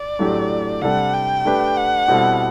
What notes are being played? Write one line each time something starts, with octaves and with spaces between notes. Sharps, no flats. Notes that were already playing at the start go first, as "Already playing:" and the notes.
Already playing: D5
A2 F#3 A3 D4 G4
C3 G3 D4 A4 F#5
G5
A3 D4 G4 B4
F#5
B2 G3 C4 E4 A4